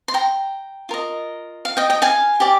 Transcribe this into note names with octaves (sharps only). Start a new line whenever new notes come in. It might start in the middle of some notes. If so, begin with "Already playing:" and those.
C6
G5 A#5
F4 A#4 D#5
F5
D#5 G5
D#5 G5
F5 G#5
G4 D5